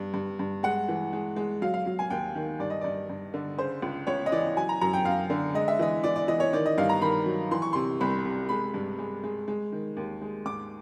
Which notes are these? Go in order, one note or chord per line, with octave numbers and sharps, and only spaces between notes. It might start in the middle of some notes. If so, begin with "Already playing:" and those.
Already playing: G2
G2
G2
G#3 F#5
E3
G#3
G#3
F#3 F5
F5
F#3
G#5
D#2 G5
D#3
G2 D5
D#5
G2 D5
G2
D3
C#3 C5
C#2
C#2 C#5
D#5
E3 D5
F#3 G#5
A#5
F#2 A#5
G5
F#2 F5
D3
G#3 D#5
E5
E3 D#5
E3 D5
D5
E3 D#5
C#5
D#3 D5
D#5
G2 F5
A#5
D#3 B5
F#3
E3 C6
C#6
C3 C6
C2 B5
C3
G#3 B5
G2
G#3
G#3
G#3
D#3
D#2
G#3
G#2 D6